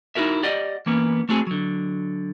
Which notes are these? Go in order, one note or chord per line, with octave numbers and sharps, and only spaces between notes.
D#4 E4 F#4 A#4 E5
G4 D5 D#5 F#5
E3 A#3 B3 C#4
A3 C4 F#4 G#4
D3 F#3